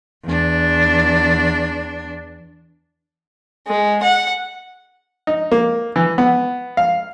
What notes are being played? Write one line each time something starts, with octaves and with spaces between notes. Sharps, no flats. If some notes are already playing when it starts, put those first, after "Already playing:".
E2 D4
G#3
F#5
D#4
A#3
E3
B3
F5